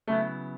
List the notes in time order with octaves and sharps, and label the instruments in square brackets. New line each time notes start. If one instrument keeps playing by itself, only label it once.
[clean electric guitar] C#3 F#3 B3 E4 [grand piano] A3